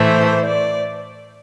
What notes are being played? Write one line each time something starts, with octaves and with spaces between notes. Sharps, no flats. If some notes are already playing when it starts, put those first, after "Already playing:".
Already playing: A2 E3 A3 C5
D5